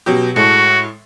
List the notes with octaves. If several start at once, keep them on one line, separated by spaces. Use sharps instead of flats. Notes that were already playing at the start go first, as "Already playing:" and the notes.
B2 F#3 G4
A2 G#3 F#4 A4